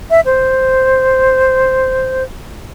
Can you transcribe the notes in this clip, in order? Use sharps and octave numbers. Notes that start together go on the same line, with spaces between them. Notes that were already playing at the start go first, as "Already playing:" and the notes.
E5
C5